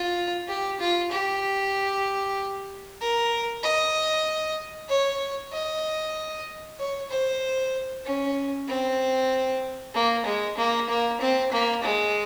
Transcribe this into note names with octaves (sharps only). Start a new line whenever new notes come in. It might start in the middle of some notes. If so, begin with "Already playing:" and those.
Already playing: F4
G4
F4
G4
A#4
D#5
C#5
D#5
C#5
C5
C#4
C4
A#3
G#3
A#3
A#3
C4
A#3
G#3